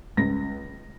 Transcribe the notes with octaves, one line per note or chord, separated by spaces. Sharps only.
C#2 A#6